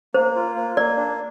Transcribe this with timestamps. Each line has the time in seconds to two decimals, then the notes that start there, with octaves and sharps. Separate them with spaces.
0.14 A#3 C5
0.35 F4
0.55 A#3
0.76 A#3 D5
0.97 D4